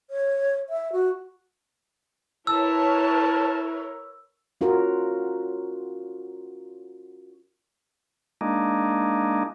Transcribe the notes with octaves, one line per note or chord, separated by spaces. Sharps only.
C#5
E5
F#4
E4 A#4 B4 C#5 A5 E6
C#4 F4 F#4 A#4
G#3 A#3 D4 D#4